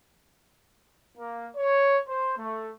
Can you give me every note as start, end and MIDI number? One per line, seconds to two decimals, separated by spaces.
1.18 1.47 58
1.57 1.98 73
2.07 2.34 72
2.38 2.71 57